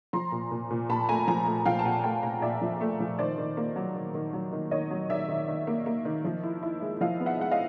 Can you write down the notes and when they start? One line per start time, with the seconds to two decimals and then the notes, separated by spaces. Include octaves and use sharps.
0.13 F3 A#5 C6
0.32 A#2
0.51 A#2
0.70 A#2
0.89 A#2 A5 B5
1.09 A3 G#5 A#5
1.28 F3 G#5 A#5
1.46 A3
1.66 F3 F5 G5
1.79 A5
1.85 A#2 F#5 G#5
2.04 A3 G5 A5
2.23 A#2 G#5 A#5
2.42 A#2 D5 E5
2.61 F3
2.81 A3
3.00 F3
3.19 D#3 C5 D5
3.38 D#3
3.57 A#3
3.76 F#3
3.95 D#3
4.14 D#3
4.33 F#3
4.52 D#3
4.71 D#3 C#5 D#5
4.91 F#3
5.10 D#3 D5 E5
5.29 D#3
5.48 D#3
5.67 A#3
5.86 A#3
6.05 D#3
6.24 F3
6.43 E4
6.63 E4
6.81 G#3
7.01 F3 D#5 F5
7.20 B3
7.26 E5 F#5
7.39 G#3 F#5
7.51 D#5 F5